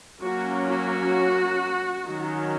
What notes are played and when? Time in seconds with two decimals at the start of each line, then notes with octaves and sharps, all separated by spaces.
0.22 F#3 A#3 C#4 F#4
0.68 F#4
2.07 D#3 F#3 C#4